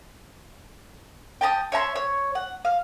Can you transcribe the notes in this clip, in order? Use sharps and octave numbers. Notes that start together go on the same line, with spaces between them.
G5 A5 A#5 D#6
C#5 E5 A#5 C6
C#5
F#5
F5